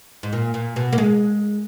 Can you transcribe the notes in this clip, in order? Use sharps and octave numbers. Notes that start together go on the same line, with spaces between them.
G#2
A#2
A#2
B2
A#3
G#3